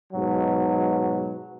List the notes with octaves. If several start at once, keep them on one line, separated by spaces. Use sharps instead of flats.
G#2 B2 F#3